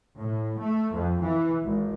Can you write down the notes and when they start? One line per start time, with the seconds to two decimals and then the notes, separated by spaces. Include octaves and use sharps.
0.18 A2
0.60 A3
0.92 F2
1.23 E3
1.63 G#1